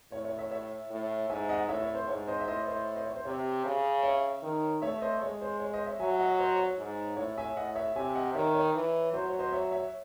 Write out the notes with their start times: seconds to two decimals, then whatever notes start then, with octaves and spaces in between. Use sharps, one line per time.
0.12 A2 C#5
0.25 C#5
0.38 C#5 E5
0.51 C#5 E5
0.90 A2
1.29 G#2 E5 G#5
1.49 D#5 F#5
1.69 A2 C#5 E5
1.82 C#5
1.95 C5
2.07 G#2 C#5
2.28 C5 D#5
2.40 E5
2.47 A2 C5 D#5
2.67 C5 D#5
2.96 C5 D#5
3.05 C#5
3.15 C5
3.25 C3 C#5
3.65 C#3
4.03 C#5 E5
4.43 D#3
4.82 A3 C#5 E5
5.01 C5 D#5
5.22 G#3 C#5
5.41 C5
5.60 C#5
5.74 C5 D#5
5.86 C#5 E5
6.00 F#3 E5 G#5
6.19 D#5 F#5
6.39 C5 D#5
6.59 C#5
6.78 G#2
7.17 A2 C#5
7.37 E5 G#5
7.56 A2 D#5 F#5
7.76 C#5 E5
7.96 C3 E5 G#5
8.15 D#5 F#5
8.34 D#3 C#5 E5
8.55 C#5
8.74 E3
9.13 F#3 C5
9.29 C#5
9.39 C5 D#5
9.52 C#5 E5
9.71 C#5 E5